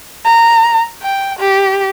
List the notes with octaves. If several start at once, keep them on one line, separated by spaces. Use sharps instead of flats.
A#5
G5
G4